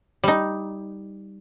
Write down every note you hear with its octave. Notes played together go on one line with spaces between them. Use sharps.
G3 D#4